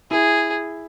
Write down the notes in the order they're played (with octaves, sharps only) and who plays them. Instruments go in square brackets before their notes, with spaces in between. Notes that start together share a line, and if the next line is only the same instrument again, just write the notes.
[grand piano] E4 [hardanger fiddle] G#4